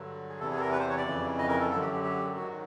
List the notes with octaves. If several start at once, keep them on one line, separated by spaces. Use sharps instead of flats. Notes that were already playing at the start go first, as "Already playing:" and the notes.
Already playing: G2 D3 F#3
G#4
E2 C3 E3 A4
G#4
A4
A#4
B4
C5
C#5
D5
F2 C#3 E3
D#5
A#4
A4
F#2 D3 F#3 A4
G4
G4
G4
G#2 D#3 F#3 F#4